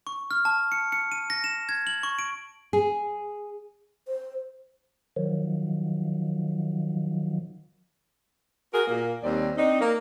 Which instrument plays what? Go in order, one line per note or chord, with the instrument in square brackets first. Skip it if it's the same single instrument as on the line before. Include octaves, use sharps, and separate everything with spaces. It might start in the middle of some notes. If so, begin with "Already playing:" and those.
[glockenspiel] C#6
F6
A5
C#7
C#7
D#7
A#6
E7
G#6
F#7
C#6
D7
[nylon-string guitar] G#4
[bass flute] C5
[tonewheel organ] D#3 F3 F#3
[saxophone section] F#4 G#4 A#4
A#2 A#3
D#2 G3 C4 C#4 D5
C4 D4 D#4
A#3